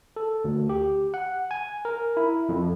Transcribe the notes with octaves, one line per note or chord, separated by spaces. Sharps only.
A4
D2
G4
F#5
G#5
A#4
E4
F2